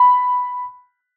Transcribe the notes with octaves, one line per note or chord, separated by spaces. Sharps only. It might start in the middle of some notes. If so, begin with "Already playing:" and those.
Already playing: B5